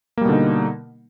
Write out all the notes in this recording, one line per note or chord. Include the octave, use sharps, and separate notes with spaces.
B2 D3 G3 A#3 D#4